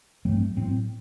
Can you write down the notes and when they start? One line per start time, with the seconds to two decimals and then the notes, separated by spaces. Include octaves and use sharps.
0.25 G2 F#3 A3 C4
0.57 A2 F#3 C4